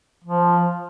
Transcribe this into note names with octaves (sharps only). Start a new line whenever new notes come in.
F3